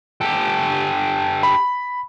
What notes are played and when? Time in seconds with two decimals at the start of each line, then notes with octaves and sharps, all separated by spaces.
0.21 G4 A4
1.43 B5